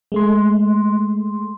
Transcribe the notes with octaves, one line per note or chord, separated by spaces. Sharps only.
G#3 A3 C6